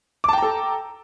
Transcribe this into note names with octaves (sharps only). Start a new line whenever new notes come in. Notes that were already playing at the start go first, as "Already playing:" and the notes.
A4 G5 A5 A#5 D6